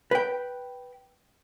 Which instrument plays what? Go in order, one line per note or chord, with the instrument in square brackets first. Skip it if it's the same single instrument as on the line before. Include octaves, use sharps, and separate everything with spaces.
[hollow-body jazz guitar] B4 G5